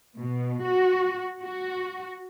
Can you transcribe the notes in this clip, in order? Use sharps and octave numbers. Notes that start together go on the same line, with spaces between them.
B2
F#4
F#4